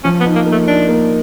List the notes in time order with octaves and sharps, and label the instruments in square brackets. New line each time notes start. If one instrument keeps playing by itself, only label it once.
[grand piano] F3 [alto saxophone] C#4
[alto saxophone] B3
[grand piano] D#4
[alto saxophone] A#3
[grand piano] A#3
[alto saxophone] A3
[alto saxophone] D4 [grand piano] D#4
[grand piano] A#3